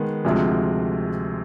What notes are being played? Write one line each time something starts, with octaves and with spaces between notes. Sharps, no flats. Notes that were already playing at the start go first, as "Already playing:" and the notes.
Already playing: D#3 G#3 B3
D2 C3 F3 G#3